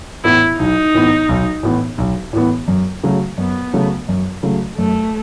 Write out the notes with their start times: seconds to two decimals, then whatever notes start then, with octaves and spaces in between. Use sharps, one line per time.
0.24 A2 E3 B3 E4
0.58 B1 D#4
0.94 A2 E3 B3
1.29 B1
1.63 A2 E3 B3
1.98 B1
2.33 A2 E3 B3
2.68 F#2
3.04 C#3 F#3 A3
3.38 F#2 B3
3.73 C#3 F#3 A3
4.08 F#2
4.43 C#3 F#3 A3
4.77 F#2 A3